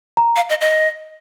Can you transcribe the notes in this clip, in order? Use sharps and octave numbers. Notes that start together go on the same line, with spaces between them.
A#5
F5
D#5
D#5